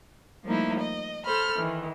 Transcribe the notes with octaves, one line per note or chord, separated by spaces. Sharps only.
F3 G3 A3 A#3 D#4 E4
D#5
A4 C5 B5 F6
D#3 E3